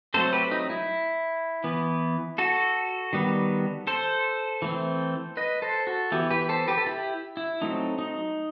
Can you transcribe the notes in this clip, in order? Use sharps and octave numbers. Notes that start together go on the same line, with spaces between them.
F#3 A3 C4 A4 C5
G4 B4
D#4
E4
E3 B3
F#4 A4
D#3 G3 B3
A4 C5
E3 A3 C4
B4 D#5
A4 C5
F#4 A4
E3 B3 E4 G4
G4 B4
A4 C5
G4 B4
A4
E4 G4
E4
F#3 A3 C4 D#4
D#4